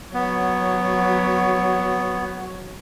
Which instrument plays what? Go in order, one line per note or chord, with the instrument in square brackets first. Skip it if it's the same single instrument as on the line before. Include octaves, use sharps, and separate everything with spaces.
[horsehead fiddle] F#3 C#5 [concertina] B3